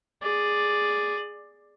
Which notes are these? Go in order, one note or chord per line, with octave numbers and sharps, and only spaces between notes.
G#4 D5